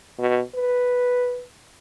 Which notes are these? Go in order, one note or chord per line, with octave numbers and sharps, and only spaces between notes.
B2
B4